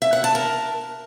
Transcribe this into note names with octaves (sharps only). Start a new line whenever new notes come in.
E5
F#5
A5
A#4